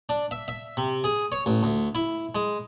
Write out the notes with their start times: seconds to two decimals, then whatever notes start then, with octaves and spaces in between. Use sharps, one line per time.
0.09 D4
0.31 E5
0.48 E5
0.77 C3
1.04 G#4
1.32 C#5
1.46 A1
1.63 D2
1.95 E4
2.35 G#3